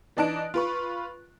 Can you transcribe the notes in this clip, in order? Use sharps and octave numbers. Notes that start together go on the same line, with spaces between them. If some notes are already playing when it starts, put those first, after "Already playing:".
E3 D4 D#4 A5 F#6 D7
F4 B4 C#6